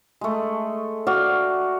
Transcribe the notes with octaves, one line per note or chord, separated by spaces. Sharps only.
G#3 A3
F#4 D5 F5